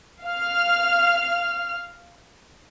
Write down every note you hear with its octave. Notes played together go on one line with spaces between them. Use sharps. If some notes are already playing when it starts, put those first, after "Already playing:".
F5 F6